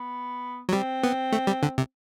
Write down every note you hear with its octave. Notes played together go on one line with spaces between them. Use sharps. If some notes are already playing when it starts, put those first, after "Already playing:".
Already playing: B3
F#3
G3 C4
B3
A3
G3
D3
C3